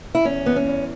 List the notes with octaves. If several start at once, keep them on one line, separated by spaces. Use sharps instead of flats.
E4
E2 C#4
E3 B3
C#4
E2